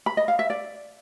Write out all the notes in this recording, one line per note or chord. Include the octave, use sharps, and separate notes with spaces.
B5
D#5
F5
E5
D5